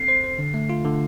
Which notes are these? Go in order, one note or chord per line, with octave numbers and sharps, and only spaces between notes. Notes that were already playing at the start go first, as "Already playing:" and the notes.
Already playing: C4 A4 C7
C5
C5
D3
A3
F4
D3